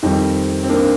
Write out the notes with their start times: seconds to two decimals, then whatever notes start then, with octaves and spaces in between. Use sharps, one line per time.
0.03 F2 D#3 G3 C4 D#4
0.63 C4
0.69 A#3 D4